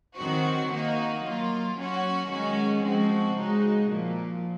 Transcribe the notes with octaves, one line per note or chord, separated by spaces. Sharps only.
D#3 F#3 C4 F#4
D#3 A#3 D#4 F#4
F#3 A#3 F4
F#3 C#4 F#4
D#3 G#3 C#4 F#4
F3 G#3 C4 F#4
C#3 G#3 D#4 F#4
A#2 F3 A#3